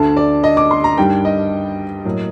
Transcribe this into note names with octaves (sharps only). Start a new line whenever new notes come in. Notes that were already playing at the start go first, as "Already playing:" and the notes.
Already playing: D2 D3 A3 A5
D5
D#5
D6
C6
A#5
G2 D#3 G3 D4 G5
D#5
A2 F#3 A#3